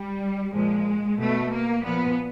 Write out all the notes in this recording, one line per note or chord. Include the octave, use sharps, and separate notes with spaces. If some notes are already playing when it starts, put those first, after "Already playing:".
Already playing: G3
A#2 F3 G#3
B2 A3
A#3
A#2 F3 B3